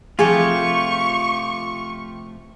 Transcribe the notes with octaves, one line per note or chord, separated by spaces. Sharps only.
C3 F3 A3 F4 G4 G#4 C#6